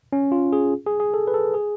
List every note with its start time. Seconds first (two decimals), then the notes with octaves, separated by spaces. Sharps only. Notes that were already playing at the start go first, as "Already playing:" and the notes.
0.13 C#4
0.32 F4
0.53 G#4
0.86 G#4
1.00 G#4
1.14 A4
1.28 B4
1.34 A4
1.54 G#4